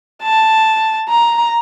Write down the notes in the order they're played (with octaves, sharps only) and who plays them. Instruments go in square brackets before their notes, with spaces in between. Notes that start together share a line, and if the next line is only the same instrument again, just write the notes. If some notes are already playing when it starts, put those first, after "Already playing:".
[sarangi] A5
A#5